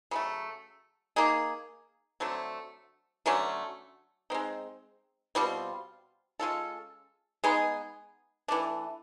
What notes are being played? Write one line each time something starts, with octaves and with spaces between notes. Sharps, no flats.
C#3 F#3 A3
A#3 D#4 G#4
D3 F#3 A3 C4
D3 F#3 A3 C#4
G#3 C4 D#4
B2 G3 C4 F4
G#3 C#4 F4 A4
G#3 B3 D#4 G#4
E3 A3 D4